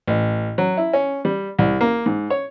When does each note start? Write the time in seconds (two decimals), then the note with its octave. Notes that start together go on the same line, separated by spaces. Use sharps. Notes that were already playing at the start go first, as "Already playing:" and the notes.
0.08 A1
0.58 F#3
0.77 E4
0.93 C#4
1.25 G3
1.59 C2
1.81 A#3
2.06 G#2
2.30 C#5